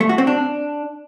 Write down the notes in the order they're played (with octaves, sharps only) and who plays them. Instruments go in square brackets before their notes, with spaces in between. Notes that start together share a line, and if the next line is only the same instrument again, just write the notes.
[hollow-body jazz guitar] A3
F#4
C4
D4